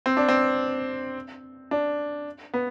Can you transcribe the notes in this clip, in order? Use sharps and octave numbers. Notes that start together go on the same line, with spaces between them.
C4
D4
C4
D4
B3